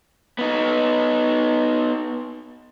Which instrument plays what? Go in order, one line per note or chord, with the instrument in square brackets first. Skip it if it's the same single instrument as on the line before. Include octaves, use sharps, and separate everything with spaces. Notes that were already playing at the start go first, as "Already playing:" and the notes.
[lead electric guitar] B3 D#4